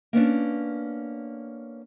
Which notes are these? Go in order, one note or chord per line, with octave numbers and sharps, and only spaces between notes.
A#3 B3 C#4 D4